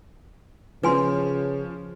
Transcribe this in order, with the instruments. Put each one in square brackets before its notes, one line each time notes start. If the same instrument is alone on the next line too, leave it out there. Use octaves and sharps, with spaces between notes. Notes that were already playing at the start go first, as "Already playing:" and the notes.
[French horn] C#3 [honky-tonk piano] F3 C#4 [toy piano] B4 G#5 C6